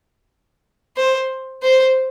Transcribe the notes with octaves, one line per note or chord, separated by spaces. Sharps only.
C5
C5